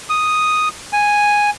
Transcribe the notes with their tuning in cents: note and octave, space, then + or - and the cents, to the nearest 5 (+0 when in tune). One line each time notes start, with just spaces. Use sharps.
D#6 +0
G#5 -5